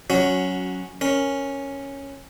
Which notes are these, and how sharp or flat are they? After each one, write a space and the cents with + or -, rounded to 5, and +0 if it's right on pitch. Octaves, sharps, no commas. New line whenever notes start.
F#3 +0 C#4 +0 F#4 -15
C#4 -5 A#4 +0